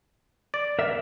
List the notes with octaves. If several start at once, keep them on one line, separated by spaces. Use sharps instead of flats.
D5
A#4 E5